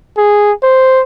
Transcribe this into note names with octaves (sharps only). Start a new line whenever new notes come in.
G#4
C5